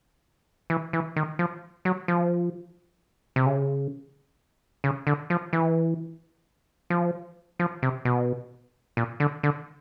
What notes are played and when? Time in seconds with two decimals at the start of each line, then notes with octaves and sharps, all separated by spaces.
0.70 E3
0.93 E3
1.16 D#3
1.39 F3
1.85 F#3
2.08 F3
3.36 C3
3.46 C#3
4.84 C#3
5.07 D3
5.30 F3
5.53 E3
6.90 F3
7.59 F3
7.83 C3
8.05 B2
8.97 A#2
9.20 D3
9.43 D3